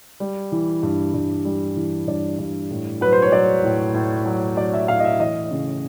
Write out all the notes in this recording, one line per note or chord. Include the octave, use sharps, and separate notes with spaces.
G3
E3
G2
G2
G3
E3
G2 D5
G2
A2
F#3 B4
C5
C#5
F#3 D5
A2
A2
F#3
F#3 D5
E5
A2 F5
D#5
E5
E3 D#5
C#3